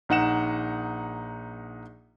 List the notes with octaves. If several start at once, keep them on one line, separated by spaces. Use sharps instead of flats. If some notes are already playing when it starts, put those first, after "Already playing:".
A#1 D#4 F#5 E7